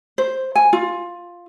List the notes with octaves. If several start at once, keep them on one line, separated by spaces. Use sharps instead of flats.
C5
G#5
F4